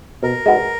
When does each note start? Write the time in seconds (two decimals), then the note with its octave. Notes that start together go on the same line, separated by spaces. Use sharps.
0.23 B2 A#4
0.46 G#3 D#4 F#4 B4